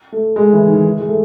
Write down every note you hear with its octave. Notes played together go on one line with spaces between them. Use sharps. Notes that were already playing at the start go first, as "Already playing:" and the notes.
A3
G#3
E3
D#3
E3
G#3
A3